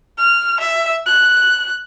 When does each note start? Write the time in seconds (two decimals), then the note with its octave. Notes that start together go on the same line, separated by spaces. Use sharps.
0.18 F6
0.60 E5
1.06 F#6